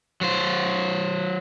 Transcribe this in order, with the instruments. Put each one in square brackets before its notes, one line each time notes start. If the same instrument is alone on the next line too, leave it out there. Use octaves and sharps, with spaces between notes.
[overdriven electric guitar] F#3 C5